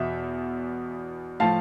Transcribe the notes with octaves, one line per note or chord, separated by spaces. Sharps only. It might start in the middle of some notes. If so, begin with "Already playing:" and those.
Already playing: E2 B2 E5
A2 F3 F5 A5